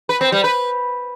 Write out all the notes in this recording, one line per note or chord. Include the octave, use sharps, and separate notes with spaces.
B4
C4
G3
B4